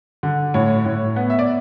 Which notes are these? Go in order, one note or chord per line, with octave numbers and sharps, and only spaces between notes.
D3
A2 C#5
A2
B3
E5
D5